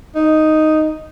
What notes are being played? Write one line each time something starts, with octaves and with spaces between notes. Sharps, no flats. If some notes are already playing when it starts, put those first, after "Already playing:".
D#4